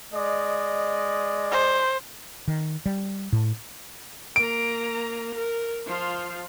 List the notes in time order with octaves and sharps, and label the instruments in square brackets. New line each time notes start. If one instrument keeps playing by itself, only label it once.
[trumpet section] G#3 D5 D#5
[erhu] C5
[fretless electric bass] D#3
G3
A2
[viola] A#3 A#5 [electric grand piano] D7
[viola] A#4
F3 F4